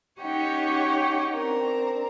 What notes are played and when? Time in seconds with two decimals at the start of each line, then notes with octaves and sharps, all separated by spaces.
0.21 C#4 D#4 G4 C#5 F#5 G5
1.34 C4 D4 A#4